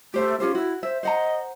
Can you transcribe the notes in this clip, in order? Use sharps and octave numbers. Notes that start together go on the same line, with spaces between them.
A3 G4 C5 E5
C#4 F4 G4 C5
E4 F#4
C5 E5
C5 D#5 F#5 A#5